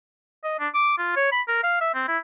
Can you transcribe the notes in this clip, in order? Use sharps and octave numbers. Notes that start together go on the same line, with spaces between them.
D#5
D4
D6
F4
C#5
B5
A#4
F5
E5
C4
E4